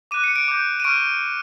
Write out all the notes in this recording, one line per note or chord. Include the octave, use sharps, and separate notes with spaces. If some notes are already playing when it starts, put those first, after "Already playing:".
D6 F#6 D#7
C#7
D7
D6 G6
D#7
C#6 F6 D7